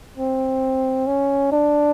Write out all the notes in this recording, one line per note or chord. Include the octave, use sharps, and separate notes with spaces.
C4
C#4
D4